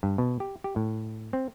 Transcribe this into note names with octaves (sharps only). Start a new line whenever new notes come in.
G2
B2
G4
G4
A2
C4